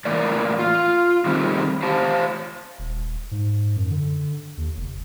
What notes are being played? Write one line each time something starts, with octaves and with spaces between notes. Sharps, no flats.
A2 E3 A#3 D5
F4
D#3 G3 A3 C4
G4 C5 F5 A5
D#1
G#2
F#2
D3
D#2
F1